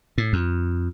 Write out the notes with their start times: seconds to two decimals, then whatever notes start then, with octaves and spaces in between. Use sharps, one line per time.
0.18 A2
0.33 F2